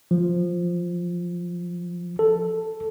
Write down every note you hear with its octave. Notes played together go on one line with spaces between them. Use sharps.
F3
A4